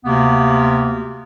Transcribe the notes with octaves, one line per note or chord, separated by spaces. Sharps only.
D2 C3 A#3 B3